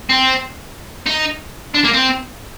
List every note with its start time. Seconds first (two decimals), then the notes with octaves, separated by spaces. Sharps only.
0.09 C4
1.06 D#4
1.74 D4
1.84 A#3
1.94 C4